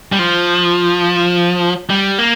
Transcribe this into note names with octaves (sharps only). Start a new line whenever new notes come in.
G3
F3
G3
A#3